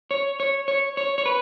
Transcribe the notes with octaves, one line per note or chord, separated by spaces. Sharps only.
C#5
C#5
C#5
C#5
C#5
B4